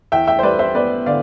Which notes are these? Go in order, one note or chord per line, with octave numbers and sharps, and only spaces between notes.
E2 E5 G5
E5 G5
C5
G3 B4 D5
C5 E5
B3 B4 D5
D3 D5 F5